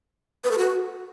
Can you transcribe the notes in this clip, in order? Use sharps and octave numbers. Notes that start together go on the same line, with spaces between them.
B4
A4
F#4